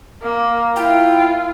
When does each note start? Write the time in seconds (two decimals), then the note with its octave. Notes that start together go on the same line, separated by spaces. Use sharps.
0.23 A#3
0.76 E4 F4 G5